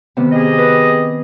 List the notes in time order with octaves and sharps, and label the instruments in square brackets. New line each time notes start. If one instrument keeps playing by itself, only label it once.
[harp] C3 D#3 B3
[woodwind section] G4 G#4 D#5
[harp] B4